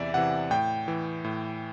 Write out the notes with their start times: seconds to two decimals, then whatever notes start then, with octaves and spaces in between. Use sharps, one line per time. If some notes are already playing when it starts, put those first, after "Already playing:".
Already playing: E2 C3 E3 D5 E5
0.14 C3 E3 F#5
0.51 A2 G5
0.88 E3
1.24 A2